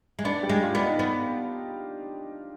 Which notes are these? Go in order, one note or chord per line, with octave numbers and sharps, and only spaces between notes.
G#3
B3 D4 D5
G3 G4
G#3
F4 F5
B3 D5
D#4 D#5
B3